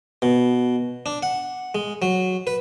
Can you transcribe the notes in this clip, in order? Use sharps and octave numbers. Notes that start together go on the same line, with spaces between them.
B2
D4
F#5
G#3
F#3
B4